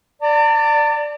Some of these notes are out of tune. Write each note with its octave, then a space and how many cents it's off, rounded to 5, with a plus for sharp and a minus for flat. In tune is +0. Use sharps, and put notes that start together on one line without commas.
D5 +0 A5 +45